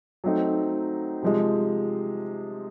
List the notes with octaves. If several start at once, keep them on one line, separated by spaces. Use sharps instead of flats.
F#3 A3 C4 D#4
C3 F3 G#3